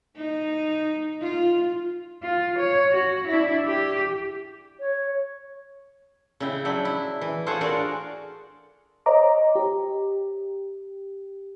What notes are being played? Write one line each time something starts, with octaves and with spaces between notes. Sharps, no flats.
D#4
F4
F4
C#5
F#4
D4 E4
G4
C#5
C#3 E4 G5
F#3 D4 E5 G5 B5
E4
E3
F4 G#4 A4 C5 C#5 F#5
D4 F4 F#4 A#4 D5 F5
C5 C#5 D#5 A#5 D6
G4